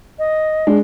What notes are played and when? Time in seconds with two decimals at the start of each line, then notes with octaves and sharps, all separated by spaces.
0.19 D#5
0.67 G#3 D4